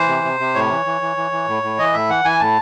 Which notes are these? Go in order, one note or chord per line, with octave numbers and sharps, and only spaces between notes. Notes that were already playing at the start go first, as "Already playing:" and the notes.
Already playing: E3 C5
C3
C3
C3
A2 C#5
E3
E3
E3
E3
E3
A2
A2
E3 D#5
A2 E5
E3 F#5
E3 G#5
A2 A5